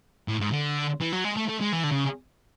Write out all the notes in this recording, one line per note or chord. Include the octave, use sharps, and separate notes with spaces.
A2
G#2
D3
E3
F#3
G#3
A3
A3
G#3
E3
D3
C#3